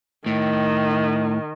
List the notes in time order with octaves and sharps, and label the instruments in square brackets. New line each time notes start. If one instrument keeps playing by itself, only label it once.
[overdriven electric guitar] A2 [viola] D#3